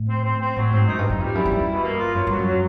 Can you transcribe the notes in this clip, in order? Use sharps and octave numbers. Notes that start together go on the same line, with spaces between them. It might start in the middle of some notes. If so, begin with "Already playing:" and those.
Already playing: A2
C4
C4
C4
A2 F#3
G#2 C4
F#2 D#4
G2
D#4
F#2
F2 G3
F#2 E4
F#2
G2 E4
B2
A#3
F4
F#2 F#3
G2 F#3
F#2
F#3